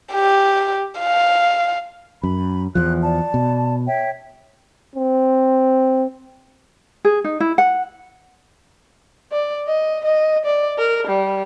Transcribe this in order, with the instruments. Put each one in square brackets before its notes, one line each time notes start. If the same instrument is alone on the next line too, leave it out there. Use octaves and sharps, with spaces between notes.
[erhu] G4
F5
[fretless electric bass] F#2 [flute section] B5
[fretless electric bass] E2 F3 [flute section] F#6
[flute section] D5 A5
[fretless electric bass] B2
[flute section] C#5 E5 G5
[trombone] C4
[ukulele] G#4
D#4
E4
F#5
[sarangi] D5
D#5
D#5
D5
A#4
G3